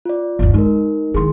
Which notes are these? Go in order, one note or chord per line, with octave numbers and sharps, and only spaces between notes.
F4 D5
G1 D#2
G#3 D#4 A#4
D#3 E4 G#4 C6